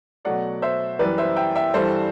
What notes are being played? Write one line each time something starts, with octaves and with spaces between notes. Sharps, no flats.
B2 F#3 A3 D5 F#5
C5 E5
F#2 E3 G3 B4 D5
C5 E5
E5 G5
E5 G5
G2 E3 G3 A4 C5